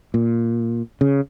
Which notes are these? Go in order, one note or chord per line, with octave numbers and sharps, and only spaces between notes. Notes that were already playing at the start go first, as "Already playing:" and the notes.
A#2
C#3